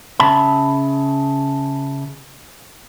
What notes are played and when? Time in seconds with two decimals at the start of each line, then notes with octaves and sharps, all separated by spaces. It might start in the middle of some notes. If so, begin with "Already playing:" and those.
0.20 C#3 E5 A5 B5